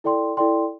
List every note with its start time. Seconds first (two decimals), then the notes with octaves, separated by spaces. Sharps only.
0.04 E4 A4 D5 G5 C6
0.37 E4 A4 D5 G5 C6